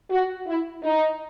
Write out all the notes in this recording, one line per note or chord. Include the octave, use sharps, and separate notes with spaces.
F#4
E4
D#4